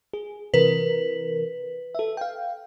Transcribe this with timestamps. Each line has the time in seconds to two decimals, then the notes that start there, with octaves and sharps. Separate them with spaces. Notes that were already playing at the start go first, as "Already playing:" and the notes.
0.13 G#4
0.54 C3 E3 A#4 B4
1.95 A4 E5
2.17 F5 G5